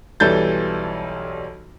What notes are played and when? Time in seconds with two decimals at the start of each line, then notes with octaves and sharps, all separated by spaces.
0.20 B1 E3 G3 A4 G6 A6